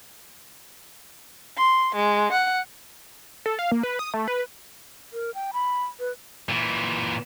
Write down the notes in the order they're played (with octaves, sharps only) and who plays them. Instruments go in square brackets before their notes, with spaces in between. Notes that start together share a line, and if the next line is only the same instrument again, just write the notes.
[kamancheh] C6
G#3
F#5
[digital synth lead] A4
F5
A#3
B4
D#6
A3
B4
[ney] A#4
G5
B5
B4
[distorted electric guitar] A#2 E3